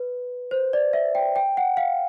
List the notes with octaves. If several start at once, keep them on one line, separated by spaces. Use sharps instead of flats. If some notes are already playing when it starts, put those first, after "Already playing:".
Already playing: B4
C5
D5
E5
G5
G5
F#5
F5